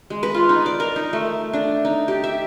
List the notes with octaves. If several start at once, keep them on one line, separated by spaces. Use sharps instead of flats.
G#3
B4
F4
D#4
D5
A#4
D#4
A3
D4
D#4
G4
E5